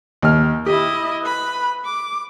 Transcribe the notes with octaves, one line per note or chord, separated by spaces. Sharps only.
D#2 F6
E4 G4 D#5
B4 B5
D6